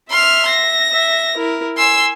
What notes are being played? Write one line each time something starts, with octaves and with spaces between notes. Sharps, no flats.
E5 C6 F6
A#6
E5
E4 A#4
G#5 C6 E6